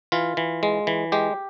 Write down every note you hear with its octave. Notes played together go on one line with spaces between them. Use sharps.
E3 F4
E3
G#3
E3
G#3 G4